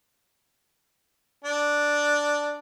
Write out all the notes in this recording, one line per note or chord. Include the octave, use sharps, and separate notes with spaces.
D4